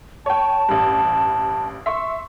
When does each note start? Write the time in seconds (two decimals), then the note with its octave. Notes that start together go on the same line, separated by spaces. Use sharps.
0.26 C#5 G5 A5
0.69 A1 G2
1.86 E5 C6 C#6